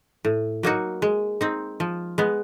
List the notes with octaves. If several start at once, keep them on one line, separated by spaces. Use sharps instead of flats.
A2
F#3 A#3 D#4 F#4
G#3
C4 D#4
F3
G#3 B3